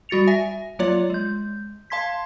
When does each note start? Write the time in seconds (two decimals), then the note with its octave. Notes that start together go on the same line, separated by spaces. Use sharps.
0.09 G3 F#4 A6 C#7 F7
0.27 E5 G#5 A#6
0.79 F#3 A#3 F4 C#5 D5
1.10 G#3 G6
1.90 F5 A5 C6 G#6 B6